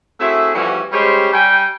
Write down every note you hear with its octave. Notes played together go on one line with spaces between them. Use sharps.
A3 C4 E4 F#4 G#4 E5
E3 F3 G3 A3 C#4 F#4
G3 G#3 C#4 G4 C5 C#5
G3 G5 G#5